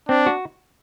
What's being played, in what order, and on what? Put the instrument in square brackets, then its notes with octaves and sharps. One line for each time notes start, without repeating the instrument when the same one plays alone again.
[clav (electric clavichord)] C4 [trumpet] D4
[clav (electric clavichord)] F#4